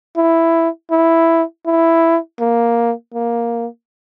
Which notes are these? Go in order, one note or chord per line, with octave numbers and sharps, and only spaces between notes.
E4
E4
E4
A#3
A#3